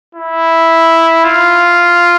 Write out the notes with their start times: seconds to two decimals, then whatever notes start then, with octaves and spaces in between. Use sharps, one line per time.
0.15 E4
1.24 F4